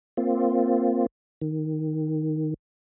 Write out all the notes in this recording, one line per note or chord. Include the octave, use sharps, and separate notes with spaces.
A#3 C4 F4
D#3